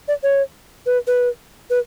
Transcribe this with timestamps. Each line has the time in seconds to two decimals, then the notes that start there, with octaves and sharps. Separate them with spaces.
0.08 D5
0.23 C#5
0.86 B4
1.07 B4
1.70 B4